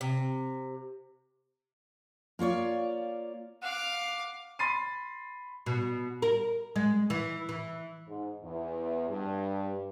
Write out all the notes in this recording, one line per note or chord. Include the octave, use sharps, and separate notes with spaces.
C3
A#3 F4 C#5 D5
F5 F#5 D6
B5 C6 A6 C7 D#7
B2
A#4
G#3
E3
E3
G#2
E2
G2